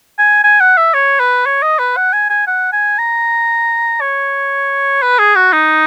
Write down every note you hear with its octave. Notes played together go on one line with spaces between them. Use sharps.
G#5
G#5
F#5
E5
C#5
B4
C#5
D#5
B4
F#5
G#5
G#5
F#5
G#5
A#5
C#5
B4
G#4
F#4
D#4